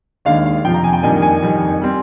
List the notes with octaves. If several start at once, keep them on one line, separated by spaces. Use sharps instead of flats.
D#2 D#3 G#3 D4 F5
F5
F2 C3 F3 G5
A#5
G#5
G5
F2 D#3 G3 A#3 D4 G#5
G#5
F2 D#3 G3
G3 C4